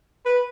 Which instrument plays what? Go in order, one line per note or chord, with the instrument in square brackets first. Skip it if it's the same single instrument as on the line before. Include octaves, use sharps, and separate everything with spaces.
[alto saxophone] B4